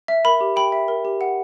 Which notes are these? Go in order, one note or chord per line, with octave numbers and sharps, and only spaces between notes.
E5
A#4 B5
G4
G5 B5
E5
A#4
G4
F#5